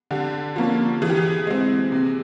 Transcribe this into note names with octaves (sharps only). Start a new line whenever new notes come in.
D3 G4
F3 A#3 C#4
E3 G#4
G4
G#4
G#3 C4
C3